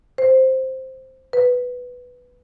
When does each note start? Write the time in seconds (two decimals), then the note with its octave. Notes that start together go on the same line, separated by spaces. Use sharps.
0.18 C5
1.33 B4